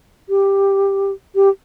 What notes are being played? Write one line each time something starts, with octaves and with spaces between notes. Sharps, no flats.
G4
G4